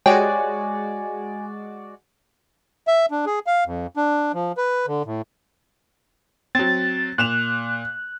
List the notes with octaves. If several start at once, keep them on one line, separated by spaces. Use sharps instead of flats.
G#3 F#4 G4 C#5 D5 G#5
E5
D4
G#4
F5
F2
D4
F3
B4
D3
A2
F#3 C4 A6
A#2 F#6 E7 F7